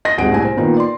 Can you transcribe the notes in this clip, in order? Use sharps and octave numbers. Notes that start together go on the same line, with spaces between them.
D#5 A#6
D#1 G#1 C4 G#4 F#5 D7
C2 A2 G#5
C5
A#2 D#3 B3 D#4 F4
D5 C6